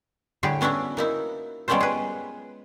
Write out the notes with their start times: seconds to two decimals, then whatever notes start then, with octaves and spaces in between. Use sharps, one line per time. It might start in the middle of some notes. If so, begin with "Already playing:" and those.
0.43 A2 D3 G3 G4 G#4
0.61 B3 C#4 D4 E4 F#4
0.97 A#3 D#4 E4
1.68 G3 G#3 B3 C#4 F4 C5
1.80 G#4 B4